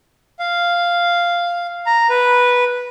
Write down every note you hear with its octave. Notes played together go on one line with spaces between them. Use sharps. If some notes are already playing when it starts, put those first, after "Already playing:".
F5
A#5
B4